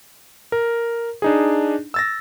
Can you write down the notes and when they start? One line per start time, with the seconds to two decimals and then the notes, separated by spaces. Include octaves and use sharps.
0.52 A#4
1.22 D4 D#4 G#4
1.94 E6 A6 A#6